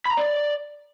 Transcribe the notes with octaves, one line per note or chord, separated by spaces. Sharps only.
B5
A#5
D5